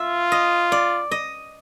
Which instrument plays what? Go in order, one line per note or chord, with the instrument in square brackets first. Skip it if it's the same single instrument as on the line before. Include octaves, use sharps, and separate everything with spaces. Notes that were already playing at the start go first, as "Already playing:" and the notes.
Already playing: [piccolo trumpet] F4 [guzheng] E5
[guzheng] D#5
D5
D#5